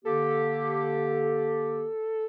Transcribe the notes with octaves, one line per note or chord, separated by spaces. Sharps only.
D3 A#3 G4 A4